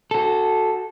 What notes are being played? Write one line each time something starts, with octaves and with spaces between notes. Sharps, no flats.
F#4 A4